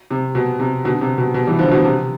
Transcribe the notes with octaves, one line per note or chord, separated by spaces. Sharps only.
C3
B2
C3
B2 D3
C3
B2
B2
E3 G3
D3 F3
B2
C3